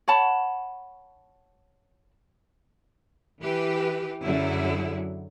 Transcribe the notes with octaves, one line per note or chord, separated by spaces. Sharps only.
C#5 F#5 A5 B5
E3 G4 B4
F#2 D3 F#3 E4 G#4